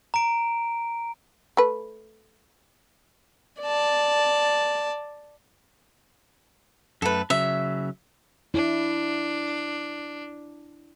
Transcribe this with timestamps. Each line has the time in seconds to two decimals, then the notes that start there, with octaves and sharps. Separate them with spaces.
0.14 A#5 D7
1.57 A3 B4
3.62 D5 A5
7.02 F#2 A3 A4 B4
7.30 C#3 F#3 E5
8.54 D4 E4